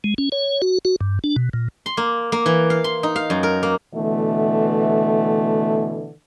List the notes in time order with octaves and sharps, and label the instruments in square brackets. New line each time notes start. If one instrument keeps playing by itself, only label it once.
[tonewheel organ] G#3
C#4
C#5
F#4
F#4
G2
D4
B2
A#2
[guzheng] C6
A#3
A#3
E3
F5
C6
D#4
F5
F#2
A#4
A#3
[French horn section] B2 D3 E3 A3